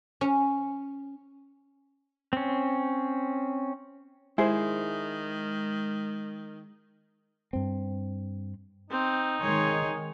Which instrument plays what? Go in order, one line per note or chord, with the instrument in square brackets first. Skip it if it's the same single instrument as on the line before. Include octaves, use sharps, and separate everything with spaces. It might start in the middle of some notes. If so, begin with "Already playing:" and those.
[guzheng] C#4
[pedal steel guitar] C4 C#4
[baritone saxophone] D#3 [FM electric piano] G#3 [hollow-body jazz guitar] E4 [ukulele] G#4 C5
[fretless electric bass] G2 C4
[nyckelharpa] C4 [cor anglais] D#4
[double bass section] D#3 G#3 [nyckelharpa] C#5 [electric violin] G#5 C6